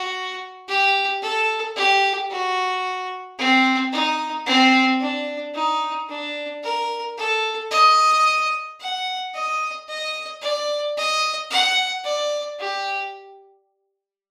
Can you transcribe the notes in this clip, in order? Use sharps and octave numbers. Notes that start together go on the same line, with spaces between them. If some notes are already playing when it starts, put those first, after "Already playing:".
Already playing: F#4
G4
A4
G4
F#4
C4
D#4
C4
D4
D#4
D4
A#4
A4
D#5
F#5
D#5
D#5
D5
D#5
F#5
D5
G4